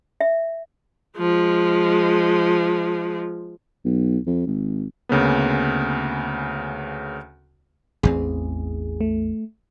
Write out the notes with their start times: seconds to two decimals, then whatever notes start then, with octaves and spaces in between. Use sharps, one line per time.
0.21 E5
1.17 F3 G#3
3.85 B1
4.27 F2
4.47 G#1
5.09 D2 C#3 A#3 B3
8.03 A1 E2 C4 G#4
9.01 A3